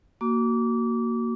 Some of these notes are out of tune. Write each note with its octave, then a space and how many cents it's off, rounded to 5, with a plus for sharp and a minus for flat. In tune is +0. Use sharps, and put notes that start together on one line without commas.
A#3 +0 F#4 +10 D6 -25